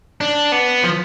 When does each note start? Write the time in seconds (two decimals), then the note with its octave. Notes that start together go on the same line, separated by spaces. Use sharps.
0.21 D4
0.52 B3
0.83 F3